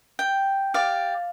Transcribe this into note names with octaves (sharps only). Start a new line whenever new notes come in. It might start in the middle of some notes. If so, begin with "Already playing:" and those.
G5
G4 D5 F5